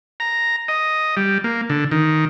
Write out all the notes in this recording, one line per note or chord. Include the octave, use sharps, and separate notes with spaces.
A#5
D#5
G3
A#3
D3
D#3